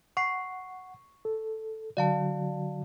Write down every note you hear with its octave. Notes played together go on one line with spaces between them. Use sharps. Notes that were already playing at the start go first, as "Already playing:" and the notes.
F#5 C#6 C7
A4
D3 F#3 F#4 D5 F5 A5